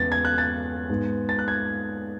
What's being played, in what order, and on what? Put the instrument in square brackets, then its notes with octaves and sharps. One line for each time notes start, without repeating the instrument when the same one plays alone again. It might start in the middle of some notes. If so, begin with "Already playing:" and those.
Already playing: [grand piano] E2 C#3 G#3 B3 A6
G#6
F#6
A6
G#2 G#3 B3
A6
F#6
G#6